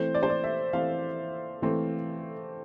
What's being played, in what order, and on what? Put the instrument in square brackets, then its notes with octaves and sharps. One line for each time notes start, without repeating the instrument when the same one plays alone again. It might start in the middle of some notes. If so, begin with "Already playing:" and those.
Already playing: [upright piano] E3 A3 C4 C5
D5
C5
D5
E5
E3 A3 C4 F5
E3 A3 C4